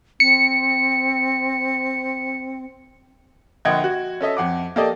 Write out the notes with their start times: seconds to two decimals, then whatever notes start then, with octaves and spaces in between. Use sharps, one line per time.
0.20 C4 C#7
3.65 A#1 D3 D#5 F#5 G5 G#6
3.84 F#4
4.21 C#4 A4 D#5 E5
4.37 F2 F#5 D6
4.76 A#3 G4 A4 D5 D#5